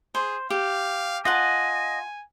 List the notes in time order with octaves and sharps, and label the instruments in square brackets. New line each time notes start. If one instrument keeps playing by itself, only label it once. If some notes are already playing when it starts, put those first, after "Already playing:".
[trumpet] G#4 [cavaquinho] C5
[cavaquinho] G4 [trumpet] F5
[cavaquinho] F4 F#5 A5 [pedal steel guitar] D#5 [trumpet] G#5